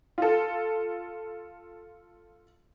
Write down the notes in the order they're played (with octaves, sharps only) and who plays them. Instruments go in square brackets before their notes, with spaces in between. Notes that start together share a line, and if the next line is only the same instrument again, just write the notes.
[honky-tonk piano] F4 A4